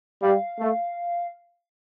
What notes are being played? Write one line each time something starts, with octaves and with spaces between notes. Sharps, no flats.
G3 F5
A3